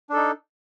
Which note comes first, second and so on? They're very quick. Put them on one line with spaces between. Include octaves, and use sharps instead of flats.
D4 A4 D#4